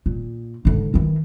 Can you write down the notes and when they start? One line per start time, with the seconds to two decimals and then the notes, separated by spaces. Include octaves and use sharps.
0.06 A#2
0.65 G#2 D3
0.94 D#3 E3